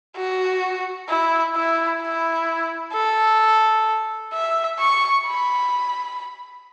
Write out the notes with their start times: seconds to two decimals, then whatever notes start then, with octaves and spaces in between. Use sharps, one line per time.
0.17 F#4
1.08 E4
1.56 E4
2.02 E4
2.94 A4
4.33 E5
4.79 C#6
5.26 B5